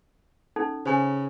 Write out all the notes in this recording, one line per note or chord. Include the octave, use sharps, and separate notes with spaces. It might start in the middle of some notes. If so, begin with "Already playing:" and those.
C#4 D#4 A4
C#3 C5 G#5